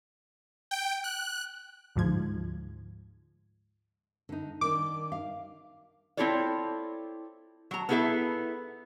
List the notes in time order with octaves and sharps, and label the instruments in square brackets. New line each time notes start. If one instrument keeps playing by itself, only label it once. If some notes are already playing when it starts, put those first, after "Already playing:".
[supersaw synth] G5
F#6
[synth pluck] D2 G#2 F3 G#6
[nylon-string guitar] D3 D#4
[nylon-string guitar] D#3 D4 [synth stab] D6
[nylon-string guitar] F5
[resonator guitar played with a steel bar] C4 E4 F4 A4 C#5 D5
F#3 A#5
B3 D#4 E4 G#4 A4 E5